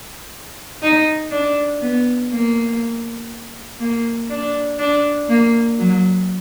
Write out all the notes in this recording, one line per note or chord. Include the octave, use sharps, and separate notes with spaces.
D#4
D4
B3
A#3
A#3
D4
D4
A#3
F#3